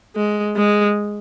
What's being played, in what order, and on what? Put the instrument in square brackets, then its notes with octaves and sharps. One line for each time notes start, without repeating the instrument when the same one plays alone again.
[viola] G#3
G#3